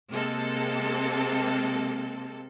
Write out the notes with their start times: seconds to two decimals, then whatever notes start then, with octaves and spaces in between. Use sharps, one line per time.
0.10 C3 G#3 A#3 C4 A4